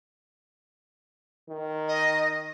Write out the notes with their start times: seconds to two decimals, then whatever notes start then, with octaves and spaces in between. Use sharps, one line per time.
1.50 D#3
1.88 D#5